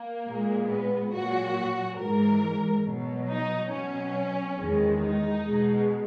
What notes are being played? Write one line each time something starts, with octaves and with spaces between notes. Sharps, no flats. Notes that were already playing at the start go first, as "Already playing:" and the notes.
Already playing: A#3
A#2 G#3
B3
A#2 F#3 F#4
G#2 E3 G#3 A#4
B2 F#3
D#4
B2 F#3 C#4
E2 D#3 G#3
D#4
B2 G#3